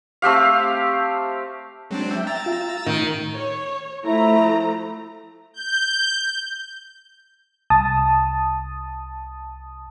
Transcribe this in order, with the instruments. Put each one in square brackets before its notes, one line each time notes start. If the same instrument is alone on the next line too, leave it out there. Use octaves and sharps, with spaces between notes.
[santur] A3 C4 G4 F5
[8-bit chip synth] F#3 C4 D4 [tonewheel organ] G#3
[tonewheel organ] E5 G5
[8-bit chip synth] A#5 E6 A6
[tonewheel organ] F4
[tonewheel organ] A2 D#4 [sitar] D#3
[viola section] C#5
[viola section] F3 A3 A#5 [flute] E4
[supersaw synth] G6
[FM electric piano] C2 A5 D#6